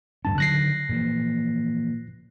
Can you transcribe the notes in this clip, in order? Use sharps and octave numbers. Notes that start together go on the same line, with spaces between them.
D1 G2 C#4 A5
D3 D#3 F#3 F#6 A#6 C7
A#2 E3 F3